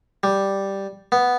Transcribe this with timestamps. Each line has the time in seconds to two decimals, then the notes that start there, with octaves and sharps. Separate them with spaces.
0.23 G3
1.12 B3